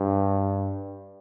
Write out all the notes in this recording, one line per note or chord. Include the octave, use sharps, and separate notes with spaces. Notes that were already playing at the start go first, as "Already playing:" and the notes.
Already playing: G2